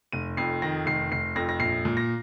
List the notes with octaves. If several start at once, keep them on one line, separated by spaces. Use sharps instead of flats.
F1 D#7
F2 C7
D#3 A#6
F1 C7
F1 C7
F2 A#6
A#6
A#1 C7
A#2
A#6